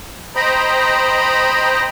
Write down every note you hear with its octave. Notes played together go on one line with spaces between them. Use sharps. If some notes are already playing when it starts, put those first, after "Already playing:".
C5 D#5 G5 A#5 B5